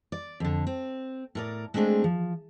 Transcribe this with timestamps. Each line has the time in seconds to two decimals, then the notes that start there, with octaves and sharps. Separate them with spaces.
0.12 D5
0.40 F2 D3
0.67 C4
1.35 A2 A#4 D5
1.74 G#3 A3 C4 D4 G#4
2.04 F3